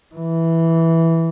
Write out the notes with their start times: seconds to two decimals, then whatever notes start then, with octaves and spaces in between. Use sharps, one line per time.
0.15 E3